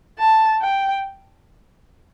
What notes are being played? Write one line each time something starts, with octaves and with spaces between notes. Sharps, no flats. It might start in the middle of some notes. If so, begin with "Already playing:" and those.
A5
G5